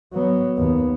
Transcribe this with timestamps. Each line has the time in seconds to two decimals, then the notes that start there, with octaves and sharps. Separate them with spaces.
0.13 F#3 B3
0.57 D#2 B3